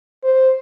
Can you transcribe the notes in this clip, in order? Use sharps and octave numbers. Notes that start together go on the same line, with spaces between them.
C5